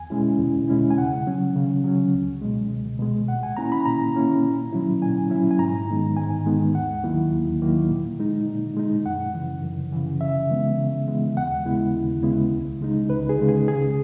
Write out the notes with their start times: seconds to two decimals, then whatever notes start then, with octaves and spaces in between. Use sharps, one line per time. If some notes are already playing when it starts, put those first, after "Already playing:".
Already playing: E2 G#5
0.10 B2 G#3 C#4 E4
0.39 E2
0.68 B2 G#3 C#4 E4
0.90 G#5
0.98 C#3 F#5
1.27 F#3 C#4
1.56 C#3
1.84 F#3 C#4
2.13 C#2
2.42 B2 G#3
2.71 C#2
2.99 B2 G#3
3.28 A#2 F#5
3.43 G#5
3.57 A#3 C#4 E4 A#5
3.72 B5
3.86 A#2 A#5
4.15 A#3 C#4 E4
4.43 A#2
4.73 F#3 C#4 E4
5.02 A#2 G#5
5.30 F#3 C#4 E4
5.51 G#5
5.59 G#2 A#5
5.88 D#3 G#3 B3 D#4
6.17 G#2 G#5
6.46 D#3 G#3 B3 D#4
6.75 D#2 F#5
7.04 D#3 F#3 A#3 E4
7.32 D#2
7.62 D#3 F#3 A#3 E4
7.90 A#2
8.19 G#3 D#4
8.47 A#2
8.77 G#3 D#4
9.06 F#2 F#5
9.34 C#3 E3
9.63 F#2
9.92 C#3 E3
10.21 C#3 E5
10.50 E3 G#3 B3
10.78 C#3
11.08 E3 G#3 B3
11.37 D#2 F#5
11.65 C#3 G#3 B3 E4
11.95 D#2
12.23 C#3 G#3 B3 E4
12.52 C#2
12.81 C#3 G#3 D#4
13.10 C#2 B4
13.29 G#4
13.38 C#3 G#3 D#4
13.49 G#4
13.68 C#3 G#4